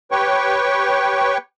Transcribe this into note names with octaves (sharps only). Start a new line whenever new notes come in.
G4 B4 C#5 G5 C#6